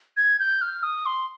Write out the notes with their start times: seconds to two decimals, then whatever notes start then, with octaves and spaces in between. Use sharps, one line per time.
0.17 G#6
0.39 G6
0.61 F6
0.83 D#6
1.06 C6